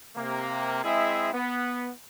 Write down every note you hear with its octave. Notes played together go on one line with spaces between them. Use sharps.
C3 A#3
G#3 C4 E4 G#4 D#5 E5
B3